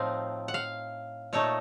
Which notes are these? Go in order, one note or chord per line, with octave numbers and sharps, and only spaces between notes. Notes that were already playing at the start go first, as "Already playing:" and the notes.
Already playing: A2 F3 C4 D#4 F5
F#5
F5
A#2 A3 D#4 C#5